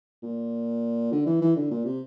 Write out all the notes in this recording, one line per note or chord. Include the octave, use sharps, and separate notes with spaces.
A#2
D3
E3
E3
D3
A#2
C3